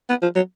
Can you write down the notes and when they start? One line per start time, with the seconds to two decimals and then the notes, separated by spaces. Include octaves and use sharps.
0.09 B3
0.22 F3
0.36 F#3